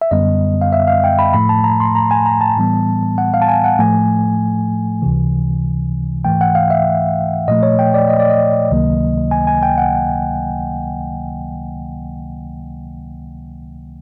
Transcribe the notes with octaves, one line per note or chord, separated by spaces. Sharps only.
E5
F#2 D3 G3 B3 D#5
F5
E5
F5
G5
B5
A2 F3 A3 B5
A5
A#5
C6
A#5
G#5
A#5
A5
A2 E3 G3 B3
F#5
F5
A5
G#5
F#5
A2 F3 A3 G#5
C#2 C3 E3
G#2 E3 A3 G5
F#5
F5
E5
A#2 F3 A3 D#5
C#5
G5
D5
D#5
D5
D#5
C#2 C3 D#3 F#3 A#3
G#5
G#5
G5
F#5